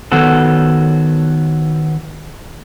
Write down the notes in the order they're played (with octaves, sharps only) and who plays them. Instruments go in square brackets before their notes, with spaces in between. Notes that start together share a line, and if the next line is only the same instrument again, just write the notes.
[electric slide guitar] D#3 F#3 B3 F#4 A4